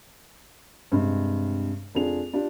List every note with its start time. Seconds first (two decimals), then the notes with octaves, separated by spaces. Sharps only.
0.92 G2 C3 G#3
1.95 F1 D4 F4 G#4 F7
2.33 D4 F4 G4